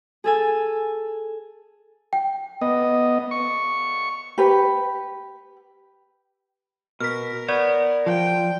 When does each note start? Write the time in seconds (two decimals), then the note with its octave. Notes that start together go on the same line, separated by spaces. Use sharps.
0.24 G#4 A4 G#5
2.13 G5
2.61 B3 D#5
3.31 C#6
4.38 G4 B4
7.00 B2 A#4 F6 B6
7.48 B3 C#5 D5
8.06 F3 G5